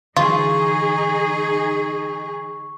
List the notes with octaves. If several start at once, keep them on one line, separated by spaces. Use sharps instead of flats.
D3 E3 F#3 D#4 F4 G#4 C#6